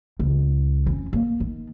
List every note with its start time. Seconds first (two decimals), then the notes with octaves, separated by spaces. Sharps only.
0.19 C#2
0.86 F2 C#4
1.13 A#3
1.40 D#3